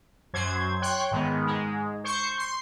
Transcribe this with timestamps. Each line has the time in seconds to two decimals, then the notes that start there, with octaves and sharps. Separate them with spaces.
0.33 F#2 F#3 C5 G#6
0.82 C#5 G5 C6 F#6
1.11 G#2 D#3 G#3 B3
1.47 G#2 G#3
2.04 C5 C#6 G6
2.38 C6